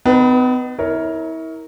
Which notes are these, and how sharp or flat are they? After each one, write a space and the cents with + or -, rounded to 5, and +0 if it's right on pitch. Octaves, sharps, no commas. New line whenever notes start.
B3 +45 D#4 -20 B4 -5
E4 -35 A#4 +0 C#5 +10